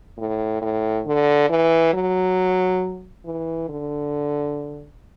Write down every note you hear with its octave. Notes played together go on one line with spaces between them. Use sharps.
A2
A2
D3
E3
F#3
E3
D3